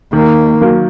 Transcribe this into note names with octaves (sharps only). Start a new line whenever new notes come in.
D#3 A#3
F#3 A#3